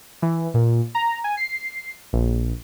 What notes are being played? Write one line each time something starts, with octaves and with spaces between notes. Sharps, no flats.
E3
A#2
A#5
G#5
C7
A#1